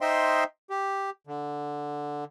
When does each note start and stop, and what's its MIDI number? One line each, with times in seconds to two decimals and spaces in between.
0.01 0.44 63
0.01 0.44 72
0.01 0.44 75
0.01 0.44 76
0.01 0.44 79
0.01 0.44 84
0.70 1.10 67
1.27 2.24 50